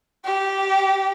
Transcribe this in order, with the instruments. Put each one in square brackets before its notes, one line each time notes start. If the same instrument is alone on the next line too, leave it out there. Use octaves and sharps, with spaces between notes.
[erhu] G4